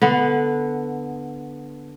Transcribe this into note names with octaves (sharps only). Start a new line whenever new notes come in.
D3 B3